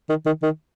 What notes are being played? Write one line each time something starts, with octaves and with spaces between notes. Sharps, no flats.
D#3
D#3
D#3